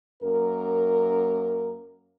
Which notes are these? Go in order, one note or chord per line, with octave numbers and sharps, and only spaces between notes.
F#2 A#3 A#4